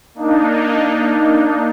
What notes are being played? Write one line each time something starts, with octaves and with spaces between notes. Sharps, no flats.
A#3 D4 D#4